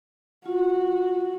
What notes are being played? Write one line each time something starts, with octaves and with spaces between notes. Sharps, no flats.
F4 F#4